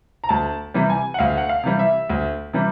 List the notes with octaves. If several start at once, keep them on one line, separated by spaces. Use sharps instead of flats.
A#5
D2 A5
C3 E3 G3
G#5
F#5
D2 F5
F#5
F5
C3 E3 G3
E5
D2
C3 E3 G3